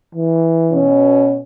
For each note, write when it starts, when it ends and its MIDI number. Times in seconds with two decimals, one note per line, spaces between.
0.15 0.93 52
0.72 1.38 47
0.72 1.38 61